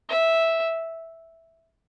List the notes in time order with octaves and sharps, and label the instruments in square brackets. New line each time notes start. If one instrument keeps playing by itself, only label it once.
[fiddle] E5